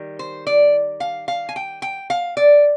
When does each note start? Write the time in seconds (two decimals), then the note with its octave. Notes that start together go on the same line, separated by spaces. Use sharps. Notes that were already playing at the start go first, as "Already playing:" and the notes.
Already playing: D#3 G3
0.19 C5
0.47 D5
1.00 F5
1.28 F5
1.49 G#5
1.56 G5
1.82 G5
2.10 F5
2.37 D5